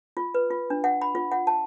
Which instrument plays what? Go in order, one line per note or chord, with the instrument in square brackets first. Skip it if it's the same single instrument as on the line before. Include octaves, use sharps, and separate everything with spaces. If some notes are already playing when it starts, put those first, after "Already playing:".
[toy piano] F4
B4
F4
D4
F#5
B5
F4
F#5
A5